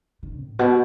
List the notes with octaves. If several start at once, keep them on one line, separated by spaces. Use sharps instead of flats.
D#3
A2
B2